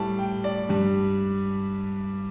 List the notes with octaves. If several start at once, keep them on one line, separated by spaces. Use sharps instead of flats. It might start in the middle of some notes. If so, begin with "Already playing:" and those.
Already playing: A2 G3 A5
G5
D5
G2 G3